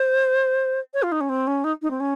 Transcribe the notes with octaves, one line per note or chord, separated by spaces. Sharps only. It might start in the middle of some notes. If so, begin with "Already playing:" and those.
Already playing: C5
C#5
F4
D#4
C#4
C4
C#4
D#4
D#4
C4
C#4